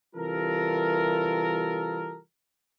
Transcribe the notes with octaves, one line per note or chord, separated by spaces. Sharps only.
C3 E3 G3 F4 A4 A#4